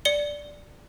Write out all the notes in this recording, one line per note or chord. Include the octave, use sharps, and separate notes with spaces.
D5 C#7 G7